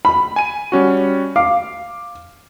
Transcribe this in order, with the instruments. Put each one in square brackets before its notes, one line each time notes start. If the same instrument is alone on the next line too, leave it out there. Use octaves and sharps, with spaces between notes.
[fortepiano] B5
[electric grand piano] G#5 D#7
G3 C#4 F#4
[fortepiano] F5 [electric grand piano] D6